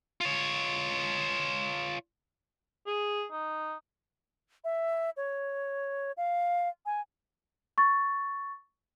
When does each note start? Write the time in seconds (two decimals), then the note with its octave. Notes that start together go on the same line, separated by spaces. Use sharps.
0.21 F4 C#5
2.87 G#4
3.32 D#4
4.64 E5
5.17 C#5
6.17 F5
6.86 G#5
7.78 C#6 A6